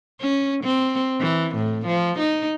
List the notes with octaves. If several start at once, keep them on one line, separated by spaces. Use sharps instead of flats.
C#4
C4
E3
A2
F3
D#4